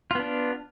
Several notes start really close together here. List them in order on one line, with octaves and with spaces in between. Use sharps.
F4 B3 D4